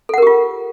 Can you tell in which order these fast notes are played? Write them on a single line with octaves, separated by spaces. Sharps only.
A4 F#5 A#4 G4 F4